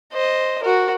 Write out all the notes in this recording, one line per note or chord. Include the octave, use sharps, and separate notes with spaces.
C5 D#5
F#4 A#4